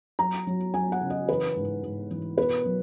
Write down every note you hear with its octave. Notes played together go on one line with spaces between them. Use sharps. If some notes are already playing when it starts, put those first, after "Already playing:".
F#3 A#5
F#3
F#3 G#5
F#5
C#3
D#5
E3 B4
G#2
G#2
E3
B2 B4
F#3